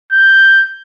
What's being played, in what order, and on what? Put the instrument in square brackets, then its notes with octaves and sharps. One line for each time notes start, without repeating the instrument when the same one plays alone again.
[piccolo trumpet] G6